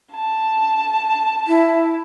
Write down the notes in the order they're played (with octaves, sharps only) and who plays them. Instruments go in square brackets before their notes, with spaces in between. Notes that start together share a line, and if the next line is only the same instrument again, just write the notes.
[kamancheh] A5
[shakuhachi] E4